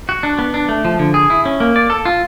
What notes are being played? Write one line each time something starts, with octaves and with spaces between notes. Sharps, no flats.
F#4
D4
B3
D4
A3
F3
D3
G#4
E4
C#4
A#3
D5
A4
F4